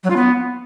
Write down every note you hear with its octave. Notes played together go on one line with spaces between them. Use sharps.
F#3
F4
B3